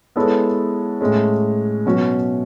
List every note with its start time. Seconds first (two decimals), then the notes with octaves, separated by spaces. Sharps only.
0.16 G#3 B3 E4 A4 C#5
1.01 A2 G#3 C#4
1.86 B2 F#3 C#4 F#4